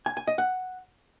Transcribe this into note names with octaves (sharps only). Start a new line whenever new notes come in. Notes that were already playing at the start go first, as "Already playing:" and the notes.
G#5
G#5
D#5
F#5